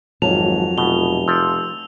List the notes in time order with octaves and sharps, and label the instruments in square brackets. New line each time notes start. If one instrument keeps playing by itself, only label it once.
[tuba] G#1 [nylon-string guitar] F2 F#3 A5 [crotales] F7
[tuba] F1 [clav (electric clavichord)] B2 [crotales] G7
[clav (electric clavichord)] F3 [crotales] E6